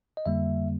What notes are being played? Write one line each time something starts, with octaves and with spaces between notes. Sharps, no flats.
D#5
F2 D3 G3 A#3 E5